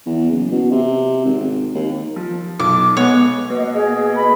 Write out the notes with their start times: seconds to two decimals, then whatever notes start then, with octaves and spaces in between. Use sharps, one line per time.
0.06 E2
0.31 F#1
0.52 B2
0.72 C3
1.25 G#1
1.74 D#2
2.16 F3
2.59 B1 D6
2.97 G#3 B3 C#5
3.50 B2 A#3 D#5
3.75 G#4
4.15 B5